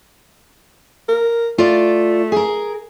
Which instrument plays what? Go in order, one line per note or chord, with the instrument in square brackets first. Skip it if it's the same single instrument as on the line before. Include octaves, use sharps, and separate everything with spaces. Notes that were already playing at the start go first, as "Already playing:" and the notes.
[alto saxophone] A#4
[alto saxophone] A3 [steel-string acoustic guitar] F4 D5
[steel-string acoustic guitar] G#4 A#4